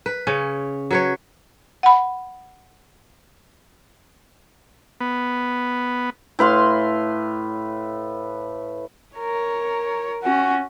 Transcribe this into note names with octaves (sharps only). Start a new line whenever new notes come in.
B4
C#3 C#4
F#3 B4 C#5
F#5 B5
B3
A2 B4 F5 C6
A#4 C#5
C#4 F#4